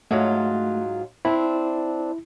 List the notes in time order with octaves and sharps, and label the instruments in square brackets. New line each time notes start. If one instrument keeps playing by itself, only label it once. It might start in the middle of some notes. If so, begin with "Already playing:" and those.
[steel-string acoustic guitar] G#2 F#3 F4 [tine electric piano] A3
[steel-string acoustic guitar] C4 D4 [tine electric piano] E4